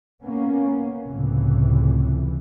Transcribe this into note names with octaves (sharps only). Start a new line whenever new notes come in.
A#3 B3 C#4
F1 C#2 A2 C3 E3